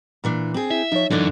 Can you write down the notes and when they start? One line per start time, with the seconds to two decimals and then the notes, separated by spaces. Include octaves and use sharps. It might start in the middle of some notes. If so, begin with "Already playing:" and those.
0.24 A#2 E3 D4
0.54 C4 G#4
0.71 E4 E5
0.92 F3 D#4 C#5
1.10 F#2 D3 E3 D4 D#4